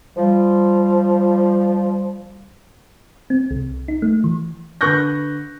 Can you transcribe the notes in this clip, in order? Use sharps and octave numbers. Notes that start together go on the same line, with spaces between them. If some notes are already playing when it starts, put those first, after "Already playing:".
F3 G3
C4
C2
D#4
A3
E3
D3 B4 C#6 F#6 G6 A#6